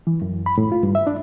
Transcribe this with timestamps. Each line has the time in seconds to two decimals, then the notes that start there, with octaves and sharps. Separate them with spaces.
0.07 E3
0.22 F#2
0.46 B5
0.58 A2
0.72 F4
0.83 G2
0.95 E5
1.07 D4